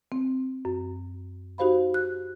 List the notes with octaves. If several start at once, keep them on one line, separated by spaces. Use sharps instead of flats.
C4
F#2
D#4 F#4 G4 C5 F5 B5
F#6